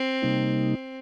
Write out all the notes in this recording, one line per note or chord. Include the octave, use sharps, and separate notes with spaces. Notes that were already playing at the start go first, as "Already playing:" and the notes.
Already playing: C4
C3 G3 A#3 D#4